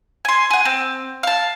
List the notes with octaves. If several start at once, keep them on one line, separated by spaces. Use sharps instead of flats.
G#5 C6
G#4 F#5
C4
F5 A5